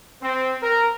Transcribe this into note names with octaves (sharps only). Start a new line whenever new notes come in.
C4
A#4